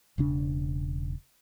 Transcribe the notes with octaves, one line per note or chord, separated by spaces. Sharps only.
E1 C#3 D4